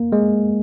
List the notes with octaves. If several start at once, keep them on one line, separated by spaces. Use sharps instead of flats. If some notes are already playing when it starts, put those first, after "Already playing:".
Already playing: A#3
G#3